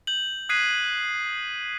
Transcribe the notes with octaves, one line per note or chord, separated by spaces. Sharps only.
G6 F#7
D#6 F#6 G#6 B6 C7 D#7